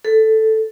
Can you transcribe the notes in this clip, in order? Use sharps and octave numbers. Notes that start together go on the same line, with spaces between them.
A4